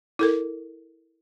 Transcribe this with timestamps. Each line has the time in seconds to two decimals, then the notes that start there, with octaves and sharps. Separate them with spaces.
0.19 E4 A4 A#4